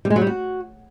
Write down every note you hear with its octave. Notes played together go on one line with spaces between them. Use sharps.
G3
G#3
F#3
G3
F#4